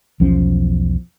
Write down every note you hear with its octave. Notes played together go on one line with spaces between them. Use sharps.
B1 E2 F3 C#4